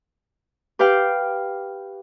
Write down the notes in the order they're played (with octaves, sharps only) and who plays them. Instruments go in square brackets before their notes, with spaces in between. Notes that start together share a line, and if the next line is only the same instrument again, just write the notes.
[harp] G4 B4 F5 G5